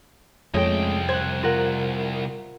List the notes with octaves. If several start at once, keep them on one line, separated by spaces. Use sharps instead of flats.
C2 F2 G#3 A3 C#4 G5
C5 F#6 G#6
F4 A#4 F#5